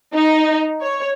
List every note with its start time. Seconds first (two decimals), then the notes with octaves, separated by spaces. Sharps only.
0.14 D#4
0.82 C#5